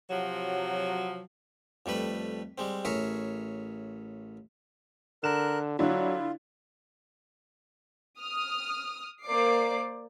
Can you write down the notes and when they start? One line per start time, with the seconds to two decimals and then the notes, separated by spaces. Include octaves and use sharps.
0.10 C3 F3 F#3
1.86 F2 G3 A3 B4 B5
2.58 G3 G#3 C4
2.85 A1 G#4 A#4 C#5 E5
5.24 D3 A#4 F#6 E7
5.79 D3 F#3 D4 E4 F4
8.20 D#6 F6
9.24 A#3 C5 D5 D6 C7